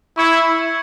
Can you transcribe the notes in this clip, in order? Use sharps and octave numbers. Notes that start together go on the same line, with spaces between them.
E4 C#6 E6 G#6 C#7